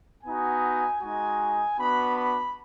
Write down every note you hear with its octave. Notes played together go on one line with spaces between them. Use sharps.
B3 D#4 F#4 G#5
G#3 D#4 F#4 G#5
B3 D4 F#4 B5
B5